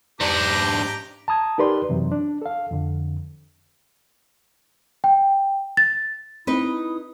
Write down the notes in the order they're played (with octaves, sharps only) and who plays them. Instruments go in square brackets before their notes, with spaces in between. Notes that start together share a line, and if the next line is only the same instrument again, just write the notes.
[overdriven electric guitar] G#2 D4 [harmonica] G4 A#5 D6
[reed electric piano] A5 A#5 D#6 G#6
D#4 G4 A#4 B4 D5 C6
F#2 C3 E3 F#3
D4
A4 F5
F2 D3
[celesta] G5
A6
[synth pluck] C4 [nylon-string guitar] D#4 B4 [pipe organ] E4 D#6